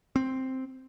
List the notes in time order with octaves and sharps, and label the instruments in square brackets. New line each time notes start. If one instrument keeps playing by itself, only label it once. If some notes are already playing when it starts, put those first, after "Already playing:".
[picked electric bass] C4